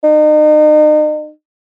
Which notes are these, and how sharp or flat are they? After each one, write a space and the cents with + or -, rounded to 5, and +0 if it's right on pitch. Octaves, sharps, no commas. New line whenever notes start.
D#4 -40